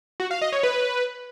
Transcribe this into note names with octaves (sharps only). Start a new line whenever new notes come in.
F#4
F5
D#5
C#5
B4